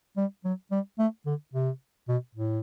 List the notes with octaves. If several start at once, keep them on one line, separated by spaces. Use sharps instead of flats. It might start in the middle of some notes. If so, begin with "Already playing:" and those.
G3
F#3
G3
A3
D3
C3
B2
A2